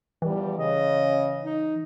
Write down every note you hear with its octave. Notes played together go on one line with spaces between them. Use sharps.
E2 E3 F3 G3
C#3 D#5
D#4